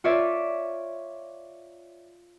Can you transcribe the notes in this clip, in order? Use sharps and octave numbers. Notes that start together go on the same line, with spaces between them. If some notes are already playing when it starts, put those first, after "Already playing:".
F4 C#5 D5 E5